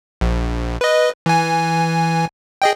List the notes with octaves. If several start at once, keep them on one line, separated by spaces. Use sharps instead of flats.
A#1
B4 D#5
E3 G#5
G#4 D#5 G5